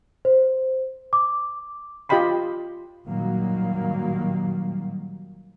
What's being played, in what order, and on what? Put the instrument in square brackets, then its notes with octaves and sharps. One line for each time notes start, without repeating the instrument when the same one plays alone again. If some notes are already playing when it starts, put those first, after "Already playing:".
[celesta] C5
D6
[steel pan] F4 G4 D#5 G5 B5 C6
[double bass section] A#2 D#3 F#3 G3 A#3